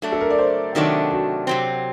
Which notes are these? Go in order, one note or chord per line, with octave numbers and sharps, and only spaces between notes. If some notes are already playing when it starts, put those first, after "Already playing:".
F#3 A3 D4
A4
A#4
D5
C5
C3 D#3 F#3 A3 D4
F#4
C3 F#3 C4